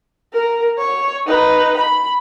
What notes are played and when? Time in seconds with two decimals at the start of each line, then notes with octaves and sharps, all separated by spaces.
0.33 A#4
0.78 C#5
1.27 D#4 B4
1.77 B5